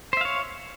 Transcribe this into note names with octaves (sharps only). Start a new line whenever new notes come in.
C5 C#5 E5 F5